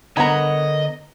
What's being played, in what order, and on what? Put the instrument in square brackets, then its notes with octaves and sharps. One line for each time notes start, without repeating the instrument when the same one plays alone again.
[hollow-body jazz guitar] D3 B3 [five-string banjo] A#4 B5 [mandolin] C#5 F#5 A#5 [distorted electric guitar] D#5